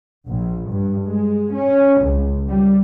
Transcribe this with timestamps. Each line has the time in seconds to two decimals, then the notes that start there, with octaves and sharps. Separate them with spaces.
0.27 A#1
0.70 G2
1.08 G#3
1.52 C#4
2.01 C#2
2.48 G3